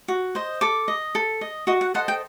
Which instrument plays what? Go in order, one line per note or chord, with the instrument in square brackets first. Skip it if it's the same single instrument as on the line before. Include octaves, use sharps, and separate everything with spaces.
[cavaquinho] F#4
C5 D#5
A4 D6
D#5
A4
D#5
F#4 D#5
F#5
A4 C5 D#5 F#5
G5